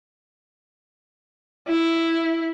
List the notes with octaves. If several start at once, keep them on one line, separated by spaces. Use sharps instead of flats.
E4